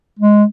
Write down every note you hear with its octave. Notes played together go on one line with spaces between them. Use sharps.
G#3